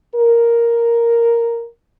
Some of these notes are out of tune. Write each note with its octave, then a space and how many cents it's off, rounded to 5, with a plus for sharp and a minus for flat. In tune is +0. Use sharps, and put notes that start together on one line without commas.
A#4 +0